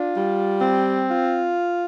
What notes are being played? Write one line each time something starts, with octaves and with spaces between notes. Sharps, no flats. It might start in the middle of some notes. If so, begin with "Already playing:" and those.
Already playing: D4 F4
G3
C4
F4